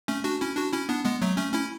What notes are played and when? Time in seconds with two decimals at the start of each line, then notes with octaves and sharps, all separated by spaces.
0.08 A3 C#4
0.24 D4 F#4
0.41 C#4 E4
0.57 D4 F#4
0.73 C#4 E4
0.89 B3 D4
1.05 G#3 B3
1.22 F#3 A3
1.37 A3 C#4
1.54 C#4 E4